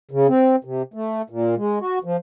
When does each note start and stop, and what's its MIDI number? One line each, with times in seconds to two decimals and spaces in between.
0.11 0.27 49
0.28 0.56 60
0.64 0.82 48
0.94 1.22 57
1.30 1.55 46
1.57 1.79 56
1.81 1.99 66
2.04 2.17 53